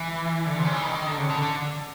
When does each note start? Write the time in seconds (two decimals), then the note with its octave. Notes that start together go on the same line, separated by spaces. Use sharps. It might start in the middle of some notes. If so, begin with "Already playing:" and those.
Already playing: E3
0.46 D3
0.59 C3
0.65 C#3
0.73 E3
0.83 D#3
0.94 D#3
1.06 D3
1.18 C#3
1.30 D3
1.42 D3